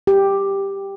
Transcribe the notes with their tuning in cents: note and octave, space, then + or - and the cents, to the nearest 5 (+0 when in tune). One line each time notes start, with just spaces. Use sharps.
G4 +5